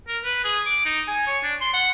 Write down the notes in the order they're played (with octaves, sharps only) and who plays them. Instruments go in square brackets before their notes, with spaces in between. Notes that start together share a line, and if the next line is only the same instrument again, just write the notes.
[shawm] A#4
B4
G#4
D6
D#4
G#5
C#5
D4
C6
F#5